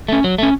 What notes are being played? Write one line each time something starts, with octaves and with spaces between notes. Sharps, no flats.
A3 C#4
F#3
A3 C#4